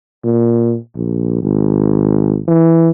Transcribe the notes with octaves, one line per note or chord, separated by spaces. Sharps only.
A#2
A#1
G#1
E3